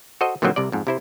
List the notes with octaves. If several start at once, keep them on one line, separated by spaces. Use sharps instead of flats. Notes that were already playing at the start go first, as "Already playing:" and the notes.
F#4 A4 C5 D#5
A#2 D3 D#3 F3 F#3 C4
C2 C3 D5
F2 G#2
C3 E4 C5